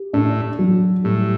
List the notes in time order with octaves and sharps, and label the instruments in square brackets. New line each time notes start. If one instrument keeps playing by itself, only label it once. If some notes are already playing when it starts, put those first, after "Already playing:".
Already playing: [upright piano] G4
[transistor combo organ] A2 [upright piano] D4
[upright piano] F#3
[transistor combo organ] A2 [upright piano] G3